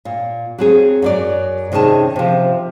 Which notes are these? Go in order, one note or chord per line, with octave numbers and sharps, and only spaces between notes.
A#2
F#3 C4 G#4
F#2 F#3 D5
C3 D#3 C#4 G#4 A5
C3 F3